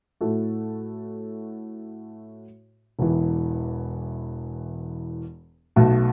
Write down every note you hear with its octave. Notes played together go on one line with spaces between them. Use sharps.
A2 A3 F#4 A4
E1 E2 E3
B1 B2 A3 F#4